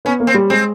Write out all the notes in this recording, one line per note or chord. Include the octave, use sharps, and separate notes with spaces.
B3 C#4
A#3
C4
G3
G#3 C4